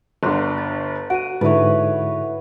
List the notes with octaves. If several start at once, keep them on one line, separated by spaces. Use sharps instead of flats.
G1 D3 A#5 C6 F#6
A6
F#4 F#5 D7 D#7
G#2 D3 E4 A4 B4 C#5 E5